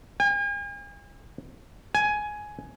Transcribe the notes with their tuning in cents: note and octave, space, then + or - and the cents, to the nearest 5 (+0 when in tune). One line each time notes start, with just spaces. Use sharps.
G#5 -45
G#5 +10